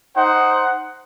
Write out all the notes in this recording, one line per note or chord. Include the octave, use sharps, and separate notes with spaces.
D#4 C5 F#5